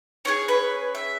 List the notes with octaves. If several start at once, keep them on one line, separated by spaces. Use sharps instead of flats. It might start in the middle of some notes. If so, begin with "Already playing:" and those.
C#4 E4 G#4 C#5
B4
E5